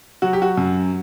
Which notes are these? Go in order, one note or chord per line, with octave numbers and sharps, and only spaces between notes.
F#3 F#4
G4
F#4
F#2